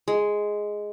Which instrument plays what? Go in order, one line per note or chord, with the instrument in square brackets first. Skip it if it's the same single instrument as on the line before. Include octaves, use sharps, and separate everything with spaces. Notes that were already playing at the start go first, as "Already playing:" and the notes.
[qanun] G#3